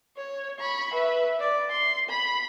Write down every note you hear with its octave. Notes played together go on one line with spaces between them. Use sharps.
C#5
B5 C#6
B4 E5
D5
C6
B5